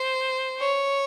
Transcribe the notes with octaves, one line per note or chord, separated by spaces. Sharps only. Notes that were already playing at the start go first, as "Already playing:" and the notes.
Already playing: C5
C#5